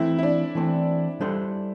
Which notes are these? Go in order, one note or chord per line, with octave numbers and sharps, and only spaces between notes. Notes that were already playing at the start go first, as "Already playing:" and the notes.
Already playing: E3 A3 C4 E4
E4
D4
E3 A3 C4
G3 D4 A4 C5